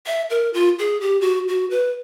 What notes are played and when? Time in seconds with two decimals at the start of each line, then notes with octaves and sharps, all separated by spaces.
0.06 E5
0.30 A#4
0.54 F4
0.79 G#4
1.01 G4
1.21 F#4
1.48 F#4
1.70 B4